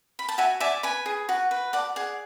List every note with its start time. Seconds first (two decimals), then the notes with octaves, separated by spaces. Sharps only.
0.19 B5
0.29 A5
0.38 F#4 E5 G#5
0.60 D5 E5 G#5
0.83 B4 G#5 B5
1.06 G#4
1.29 F#4
1.51 B4
1.73 D5 F#5 A5
1.96 G#4 F#5